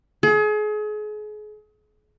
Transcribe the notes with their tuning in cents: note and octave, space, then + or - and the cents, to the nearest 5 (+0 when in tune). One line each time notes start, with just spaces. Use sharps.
G#4 +35